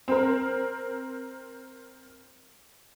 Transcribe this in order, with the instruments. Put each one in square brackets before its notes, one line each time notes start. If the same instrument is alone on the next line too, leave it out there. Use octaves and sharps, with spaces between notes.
[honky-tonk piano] C4 A#4